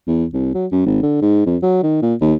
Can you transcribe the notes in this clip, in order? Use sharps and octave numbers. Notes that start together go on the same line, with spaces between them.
E2
C2
F#3
F#2
G#1
D3
G#2
F2
F#3
D#3
A#2
D#2